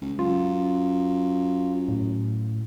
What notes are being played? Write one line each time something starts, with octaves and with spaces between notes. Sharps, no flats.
C#2
F#2 F4
A2